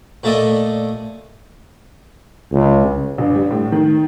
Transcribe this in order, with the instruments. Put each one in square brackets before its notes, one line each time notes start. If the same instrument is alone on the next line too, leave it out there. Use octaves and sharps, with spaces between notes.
[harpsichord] A#2 A3 A4 D5 D#5 A5
[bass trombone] C#2
[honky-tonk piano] G1
G3
A2
D#3